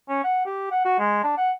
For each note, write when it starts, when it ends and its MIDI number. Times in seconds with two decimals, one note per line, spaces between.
0.09 0.23 61
0.24 0.41 78
0.46 0.68 67
0.71 0.83 78
0.85 0.95 66
0.99 1.21 56
1.23 1.34 62
1.37 1.51 78